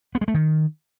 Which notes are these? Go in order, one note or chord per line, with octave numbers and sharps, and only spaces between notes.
B3
G#3
A3
D#3